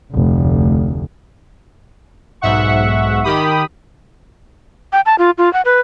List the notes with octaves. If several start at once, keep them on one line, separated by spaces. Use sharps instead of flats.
F1 D2
B1 G#2 E5 F#5 C#6
D#3 G4 B5 D#6
G5
A5
F4
F4
F#5
B4